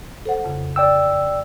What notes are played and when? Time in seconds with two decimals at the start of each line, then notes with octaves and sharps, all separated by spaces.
0.26 A4 C5 F#5
0.44 F2 C#3
0.76 D5 G5 E6